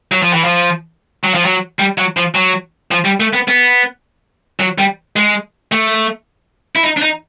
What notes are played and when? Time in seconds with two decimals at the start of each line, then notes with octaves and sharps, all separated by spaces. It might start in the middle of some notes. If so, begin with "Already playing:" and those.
0.12 F#3
0.22 F3
0.33 E3
0.44 F3
1.24 F#3
1.35 F3
1.45 F#3
1.79 G3
1.98 F#3
2.17 F3
2.35 F#3
2.91 F3
3.05 G3
3.20 A3
3.33 B3
3.48 B3
4.60 F#3
4.78 G3
5.16 G#3
5.72 A3
6.76 E4
6.83 D#4
6.97 D4
7.02 D#4